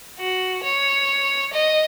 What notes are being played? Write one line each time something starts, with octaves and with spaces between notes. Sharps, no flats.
F#4
C#5
D#5